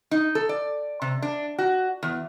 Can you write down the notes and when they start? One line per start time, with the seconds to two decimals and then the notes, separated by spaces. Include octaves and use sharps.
0.11 D#4
0.35 A4
0.49 D5
1.02 C3
1.22 D4
1.58 F#4
2.03 E2